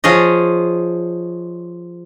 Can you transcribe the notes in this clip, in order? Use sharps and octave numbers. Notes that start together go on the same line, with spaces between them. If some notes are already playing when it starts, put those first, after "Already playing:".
F3 F4 G#4 C#5 D#5